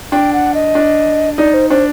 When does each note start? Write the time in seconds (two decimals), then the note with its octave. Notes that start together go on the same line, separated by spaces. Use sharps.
0.12 D4 G5
0.33 F#5
0.54 D#5
0.75 D4
1.38 D#4 D5
1.54 C5
1.70 D4 C5